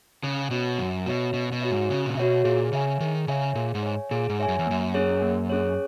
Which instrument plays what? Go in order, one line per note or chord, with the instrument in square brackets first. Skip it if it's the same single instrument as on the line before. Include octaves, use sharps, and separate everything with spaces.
[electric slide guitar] C#3 [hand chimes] C#4
[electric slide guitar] B2 [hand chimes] F#4 C#5 E5
[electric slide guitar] F#2 [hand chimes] C#4
[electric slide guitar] B2 [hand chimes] F#4 C#5 E5
[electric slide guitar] B2 [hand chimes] C#4
[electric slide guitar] B2
[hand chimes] F#4 C#5 E5
[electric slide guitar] G#2
[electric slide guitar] C#3 [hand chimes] C#4
[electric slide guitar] A#2
[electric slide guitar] B2 [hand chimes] F#4 C#5 E5
[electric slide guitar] A#2 [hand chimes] G#4
[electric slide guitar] C#3 [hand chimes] C#5 E5 G#5
[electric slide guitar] D#3 [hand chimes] G#4
[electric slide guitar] C#3 [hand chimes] C#5 E5 G#5
[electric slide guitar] A#2 [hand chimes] G#4
[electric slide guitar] G#2
[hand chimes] C#5 E5 G#5
[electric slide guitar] A#2 [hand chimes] G#4
[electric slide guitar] G#2
[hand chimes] C#5 E5 G#5
[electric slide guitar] F#2
E2
[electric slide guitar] F#2 [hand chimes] A#3
[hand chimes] C#4 G#4 C#5
A#3
C#4 G#4 C#5